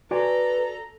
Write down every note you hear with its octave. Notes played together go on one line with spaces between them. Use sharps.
F#4 A4 B4 D5 G#5 A#5